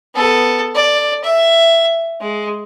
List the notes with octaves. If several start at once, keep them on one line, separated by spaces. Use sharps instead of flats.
B3 A4
D5
E5
G#3